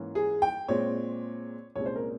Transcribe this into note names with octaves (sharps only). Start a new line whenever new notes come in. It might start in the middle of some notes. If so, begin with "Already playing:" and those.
Already playing: G#2 E3 A#3 C#4
G#4
G5
A#2 G#3 C4 C#5
C2 A#2 G#3 C#4 C#5
C5
A#4